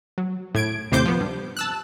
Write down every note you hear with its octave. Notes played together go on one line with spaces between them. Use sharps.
F#3
A2 G#6 D7
D#2 A2 C3 C5 D6 G6
F3 B3
G2
A5 E6 F#6